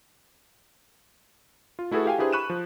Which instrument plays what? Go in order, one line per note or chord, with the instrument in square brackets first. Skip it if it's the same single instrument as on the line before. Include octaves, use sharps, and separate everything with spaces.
[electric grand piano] F4
A3 E4 F#4 G#4 A4 B4
G4 F5 G5 G#5
D4 E4 G4 G#4 B4 C5
B5 C#6 F#6 D#7 E7
F3